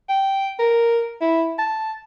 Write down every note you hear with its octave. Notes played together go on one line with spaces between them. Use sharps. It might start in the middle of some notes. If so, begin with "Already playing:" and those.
G5
A#4
E4
A5